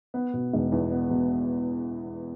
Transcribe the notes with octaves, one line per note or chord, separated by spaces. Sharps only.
B3
B2
E1
E2
B3
B2